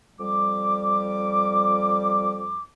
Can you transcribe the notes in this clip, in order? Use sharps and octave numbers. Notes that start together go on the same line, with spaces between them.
F2 G3 D6